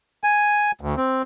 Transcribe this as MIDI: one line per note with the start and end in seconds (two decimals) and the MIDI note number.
0.24 0.71 80
0.81 0.95 38
0.97 1.22 60